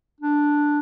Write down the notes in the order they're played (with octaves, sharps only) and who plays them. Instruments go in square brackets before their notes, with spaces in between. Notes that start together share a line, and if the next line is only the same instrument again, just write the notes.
[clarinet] D4